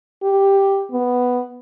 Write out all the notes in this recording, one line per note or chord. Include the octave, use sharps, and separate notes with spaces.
G4
B3